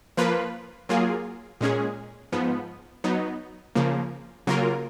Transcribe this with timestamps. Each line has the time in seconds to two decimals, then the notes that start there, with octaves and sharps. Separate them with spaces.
0.17 F3 A#3 F4 B4
0.89 F#3 A#3 F4 G#4
1.61 A#2 G#3 C#4 G#4
2.32 G#2 F3 B3
3.04 F#3 B3 D#4
3.75 C#3 F3 A#3
4.47 C#3 F#3 A#3 F4 A#4